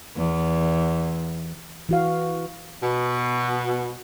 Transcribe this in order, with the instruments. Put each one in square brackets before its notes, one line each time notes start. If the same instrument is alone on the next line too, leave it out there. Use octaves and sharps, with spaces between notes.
[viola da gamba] E2
[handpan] E3 F#4 F5
[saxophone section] B2